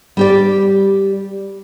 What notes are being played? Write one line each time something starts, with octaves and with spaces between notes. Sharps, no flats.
G3 G4 D5